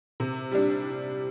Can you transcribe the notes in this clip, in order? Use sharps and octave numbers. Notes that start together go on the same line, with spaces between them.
C3
G3 D4